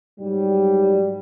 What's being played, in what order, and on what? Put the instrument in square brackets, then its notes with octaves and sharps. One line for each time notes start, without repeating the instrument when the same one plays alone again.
[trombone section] G#2 F#3 G3